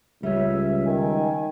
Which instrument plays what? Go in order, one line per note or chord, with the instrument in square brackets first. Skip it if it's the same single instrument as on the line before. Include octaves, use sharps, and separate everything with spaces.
[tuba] C#2 [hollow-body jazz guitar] G3 C#4 [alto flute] E5
[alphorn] D#3 [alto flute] G#5